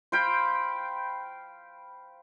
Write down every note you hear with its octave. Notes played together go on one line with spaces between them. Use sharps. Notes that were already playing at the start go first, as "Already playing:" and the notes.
C5 F5 G5 B5